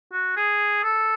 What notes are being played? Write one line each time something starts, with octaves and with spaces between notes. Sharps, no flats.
F#4
G#4
A4